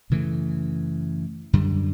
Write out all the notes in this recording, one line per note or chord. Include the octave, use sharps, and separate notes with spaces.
F#2 C#3 E3 A3
F#2 D3 G3